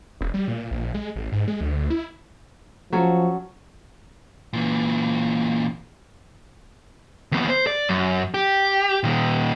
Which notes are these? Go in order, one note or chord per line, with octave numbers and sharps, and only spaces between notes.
E1
G3
A#2
A#1
G#3
A1
G#2
G#3
D2
E4
F3 F#3 C#4 A4
A#2 E3
D#2 B3
C5
D5
F#2
G4
A#2 D#3